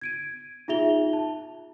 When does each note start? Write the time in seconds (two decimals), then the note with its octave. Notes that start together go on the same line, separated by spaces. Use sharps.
0.01 G#6 D7 D#7
0.68 D#4 F4 G#4 E5 F7 G7
1.13 A5